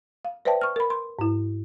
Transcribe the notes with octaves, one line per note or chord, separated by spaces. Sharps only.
F5
B4 C5 D5 E5 G5 A5
C#6 F6
A#4 B5
C6
G#2 E4